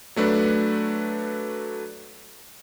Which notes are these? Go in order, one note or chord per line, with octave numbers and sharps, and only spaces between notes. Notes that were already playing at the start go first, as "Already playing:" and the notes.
F#3 A3 D4 B4